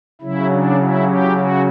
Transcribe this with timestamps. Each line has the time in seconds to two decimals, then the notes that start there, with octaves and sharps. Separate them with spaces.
0.21 C#3 F#3 E4
0.51 D4
0.79 E4
1.07 G4
1.36 F#4